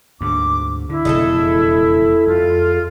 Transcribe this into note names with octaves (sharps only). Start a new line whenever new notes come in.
D2 G#2 D6
D3 E4
E1 F2 C#3 G#3 A3 A4
F2 F4